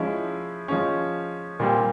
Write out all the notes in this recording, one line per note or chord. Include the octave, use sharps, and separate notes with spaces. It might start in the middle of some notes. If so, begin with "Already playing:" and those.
Already playing: F3 G#3 C#4 E4
F3 G#3 C#4
A#2 G3 C4